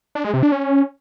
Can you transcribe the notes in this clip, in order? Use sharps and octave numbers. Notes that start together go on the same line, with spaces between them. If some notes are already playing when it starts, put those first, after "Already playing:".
D4
G#3
C3
D4
C#4